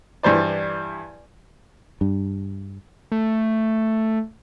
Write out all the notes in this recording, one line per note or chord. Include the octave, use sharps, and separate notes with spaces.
G2 E3 C5 D5
G2
A3